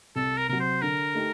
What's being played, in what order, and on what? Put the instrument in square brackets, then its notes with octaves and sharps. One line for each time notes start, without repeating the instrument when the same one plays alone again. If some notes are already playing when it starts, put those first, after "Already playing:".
[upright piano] C2 [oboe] A4
[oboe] A#4
[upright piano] C3 F#3 [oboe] A#4
[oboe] C5
[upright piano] D3 [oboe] A#4
[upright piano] A3 D#4 G4